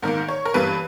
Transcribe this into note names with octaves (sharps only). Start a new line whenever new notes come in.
G#2 D#3 A#3 A#4
C#5
A#4
G2 E3 G3 A#3 B4